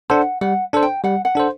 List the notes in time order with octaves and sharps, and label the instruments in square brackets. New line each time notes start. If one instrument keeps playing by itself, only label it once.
[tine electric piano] D4 A4 C5 [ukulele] F#5
[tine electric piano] G3 [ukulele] F#5
[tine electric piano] D4 A4 C5
[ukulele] G5
[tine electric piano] G3 [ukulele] F#5
[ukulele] F#5
[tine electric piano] D4 A4 C5